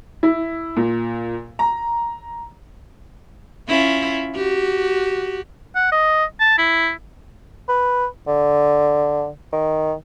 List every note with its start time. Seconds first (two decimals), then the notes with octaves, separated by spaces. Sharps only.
0.23 E4
0.76 A#2
1.59 A#5
3.68 C#4 E4 F4
4.35 F#4 G4
5.75 F#5
5.92 D#5
6.40 A5
6.58 E4
7.69 B4
8.28 D3
9.53 D#3